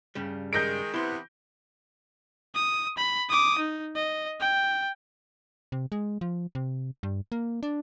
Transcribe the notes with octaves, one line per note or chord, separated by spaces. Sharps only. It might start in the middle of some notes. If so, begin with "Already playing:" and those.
G2 C#3 G3
D#3 G#3 G6 A#6 D7
C3 E3 B3 E4 C6
D#6
B5
D6 D#6
D#4
D#5
G5
C3
G#3
F3
C3
G2
A#3
D4